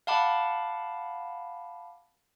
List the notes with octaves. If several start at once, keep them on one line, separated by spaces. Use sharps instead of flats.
F5 F#5 A5 B5 D6